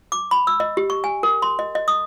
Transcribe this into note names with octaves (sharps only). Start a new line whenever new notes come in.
D6
B5
E6
D#5
G4
C#6
G#5
A#4
C6
D#5
D#5
D#6